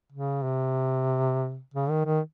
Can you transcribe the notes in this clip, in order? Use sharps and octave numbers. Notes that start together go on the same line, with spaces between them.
C#3
C3
C#3
D#3
D#3